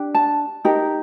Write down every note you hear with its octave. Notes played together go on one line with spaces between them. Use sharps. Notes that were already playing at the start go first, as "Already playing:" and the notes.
Already playing: D4 G4
A5
D#4 G4 A#4